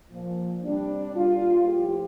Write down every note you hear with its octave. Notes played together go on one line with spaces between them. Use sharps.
A#2 F3
C3 G3 D4
A#2 G3 F4
A2 F3 G4